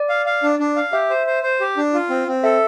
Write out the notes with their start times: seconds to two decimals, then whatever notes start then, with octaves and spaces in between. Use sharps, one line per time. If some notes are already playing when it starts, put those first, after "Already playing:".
Already playing: D5
0.09 F5
0.26 F5
0.43 D4
0.59 D4
0.76 F5
0.93 G4 E5
1.10 C5
1.27 C5
1.43 C5
1.61 G4
1.77 D4
1.94 F4
2.10 C4
2.28 C4
2.44 A4 E5